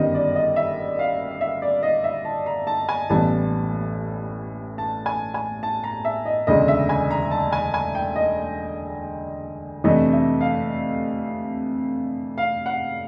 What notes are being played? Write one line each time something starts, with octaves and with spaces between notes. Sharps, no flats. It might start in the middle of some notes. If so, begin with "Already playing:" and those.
Already playing: G1 F#2 D#3 G3 B3 D#5
D5
D#5
E5
F5
E5
D5
D#5
E5
A5
A#5
A5
G#5
A1 A2 E3 G3 B3 A5
A5
G#5
G#5
A5
A#5
E5
D#5
E1 D2 C#3 D#5
E5
G#5
A#5
A5
G#5
G#5
G5
D#5
F2 C3 E3 A3 D4 D#5
E5
F5
F5
F#5